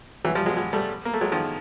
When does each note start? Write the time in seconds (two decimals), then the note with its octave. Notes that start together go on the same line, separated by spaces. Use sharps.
0.25 E3 F#3
0.35 F3 G3
0.46 F#3 G#3
0.57 F#3 G#3
0.73 G3 A3
1.05 A#3
1.14 A3
1.21 F#3 G#3
1.32 D#3 F3